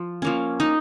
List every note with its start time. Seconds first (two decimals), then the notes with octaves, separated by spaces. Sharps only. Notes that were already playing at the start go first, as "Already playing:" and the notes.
Already playing: F3
0.22 F3 A#3 C#4
0.60 D#4